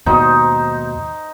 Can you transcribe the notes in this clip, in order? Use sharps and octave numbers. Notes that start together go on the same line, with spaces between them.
D#2 G#2 B2 D#4 C5